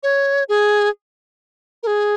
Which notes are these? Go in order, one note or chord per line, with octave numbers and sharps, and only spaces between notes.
C#5
G#4
A#4
G#4